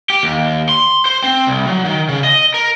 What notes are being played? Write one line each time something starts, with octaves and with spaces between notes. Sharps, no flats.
G4
D#2
C6
C5
C4
C2
F#3
D#3
C#3
D#5
A#4